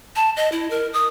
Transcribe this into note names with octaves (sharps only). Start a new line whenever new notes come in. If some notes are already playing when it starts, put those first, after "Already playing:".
A5
D#5
E4
A#4
D#6